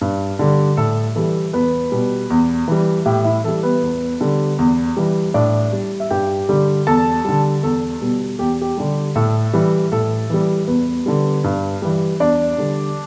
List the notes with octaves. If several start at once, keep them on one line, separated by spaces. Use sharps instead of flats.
G2
D3 G3
A2 A4
E3 G3 A4
E2 B3 B4
B2 G3
E2
E3 G3
A2 G4
E4 E5
E3 G3 A4
B3 B4
E2
D3 G3
E2
E3 G3
A2 D4 D5
G3
E5
G2 G4 G5
D3 G3
E2 A4 A5
D3 G3
E2 A4
B2 G3
E2 G4
G4
D3 G3
A2 A4
E3 G3
A2 A4
E3 G3
E2 B3 B4
D3 G3
G2
E3 G3
E2 D4 D5
D3 G3